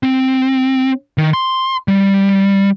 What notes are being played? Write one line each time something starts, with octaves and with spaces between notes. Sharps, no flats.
C4
D#3
C6
G3